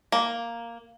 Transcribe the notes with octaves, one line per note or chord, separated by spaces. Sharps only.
A#3